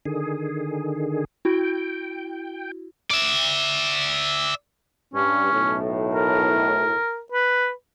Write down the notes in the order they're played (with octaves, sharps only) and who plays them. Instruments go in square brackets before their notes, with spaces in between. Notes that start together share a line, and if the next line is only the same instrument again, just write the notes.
[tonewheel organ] D3 D#3 G#4
[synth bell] E4 F#4 [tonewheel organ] G5
[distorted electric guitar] D5 E5
[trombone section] G2 [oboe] C#4
[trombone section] B1 A2
[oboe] A#4
B4